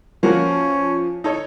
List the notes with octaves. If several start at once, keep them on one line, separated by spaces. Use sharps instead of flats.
F3 A#3 C#4 F#4 A#4
D#4 A4 C#5